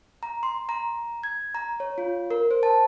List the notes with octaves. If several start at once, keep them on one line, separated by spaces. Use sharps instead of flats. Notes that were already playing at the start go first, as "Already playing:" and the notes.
A#5
C6
A#5
G#6
A#5
C#5
F4
A#4
C5
A5